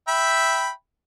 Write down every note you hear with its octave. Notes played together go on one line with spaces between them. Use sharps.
E5 G5 B5